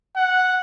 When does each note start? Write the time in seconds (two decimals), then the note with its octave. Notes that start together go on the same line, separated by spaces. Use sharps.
0.16 F#5